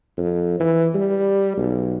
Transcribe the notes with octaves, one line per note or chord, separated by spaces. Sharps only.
F2
E3
G3
B1